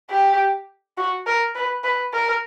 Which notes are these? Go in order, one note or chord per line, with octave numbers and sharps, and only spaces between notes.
G4
F#4
A#4
B4
B4
A#4